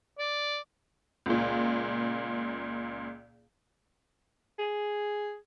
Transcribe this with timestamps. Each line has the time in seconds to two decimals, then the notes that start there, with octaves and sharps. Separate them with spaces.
0.19 D5
1.26 C#2 A#2
4.59 G#4